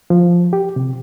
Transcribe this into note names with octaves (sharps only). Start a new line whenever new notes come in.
F3
G4
C3